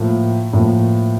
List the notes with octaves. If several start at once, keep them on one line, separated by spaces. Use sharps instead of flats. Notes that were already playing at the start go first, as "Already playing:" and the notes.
Already playing: A2 F3 A#3
A2 F3 A#3